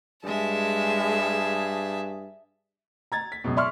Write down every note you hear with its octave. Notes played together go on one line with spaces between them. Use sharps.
G2 G#3 G#4 E5 A5
A#5 G#6 A6
B6
C#2 F#2 B2
D5 E5 C6 C#6 F6